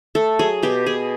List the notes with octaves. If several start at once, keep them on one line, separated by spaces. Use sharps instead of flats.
A3 A4
F#3 G#4
B2 G4
B2 G#4